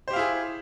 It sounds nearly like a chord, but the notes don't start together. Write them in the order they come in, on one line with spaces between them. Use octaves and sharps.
C5 G4 F5 E4 G#4